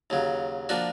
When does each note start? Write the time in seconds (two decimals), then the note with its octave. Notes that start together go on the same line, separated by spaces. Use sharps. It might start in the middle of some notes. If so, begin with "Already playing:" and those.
0.10 D#2 C#3 F#3
0.69 F3 A#3 D4 F#4